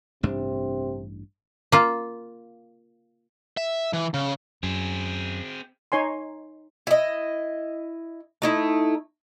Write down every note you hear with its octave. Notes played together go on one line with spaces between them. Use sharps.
A1 G2 C3 D4
A#3 F4
E5
E3
C#3
F#2 C4 G#4
D#4 C#5 G#5 C6
E4 D#5
A3 D#4 E4